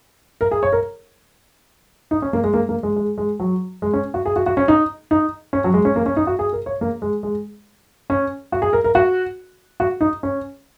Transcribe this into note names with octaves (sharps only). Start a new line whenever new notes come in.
A#4
G#4
C#5
A#4
D#4
C#4
A#3
G#3
A#3
A#3
G#3
G#3
G#3
F#3
G#3
C#4
F#4
G#4
F#4
F#4
C#4
D#4
D#4
C#4
F#3
G#3
C#4
A#3
C#4
D#4
F#4
G#4
A#4
C#5
A#3
G#3
G#3
C#4
F#4
G#4
A#4
A#4
F#4
F#4
D#4
C#4